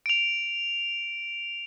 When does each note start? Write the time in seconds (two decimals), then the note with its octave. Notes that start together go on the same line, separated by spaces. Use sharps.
0.06 D7 F7